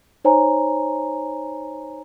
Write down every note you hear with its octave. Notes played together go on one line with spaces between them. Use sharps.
D#4 C5 C#5 G#5 A#5